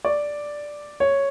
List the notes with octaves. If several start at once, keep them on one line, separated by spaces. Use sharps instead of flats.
D5
C#5